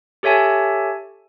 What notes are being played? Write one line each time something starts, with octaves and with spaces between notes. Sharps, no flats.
G4 A4 C#5 E5 G#5 A5